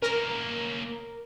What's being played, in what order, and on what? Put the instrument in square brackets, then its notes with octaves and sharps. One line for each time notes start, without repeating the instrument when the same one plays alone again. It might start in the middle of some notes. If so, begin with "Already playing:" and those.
[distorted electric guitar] A#3 C#4 [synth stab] A#4